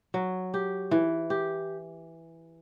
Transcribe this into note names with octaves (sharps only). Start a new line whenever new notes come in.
F#3
G4
E3
G4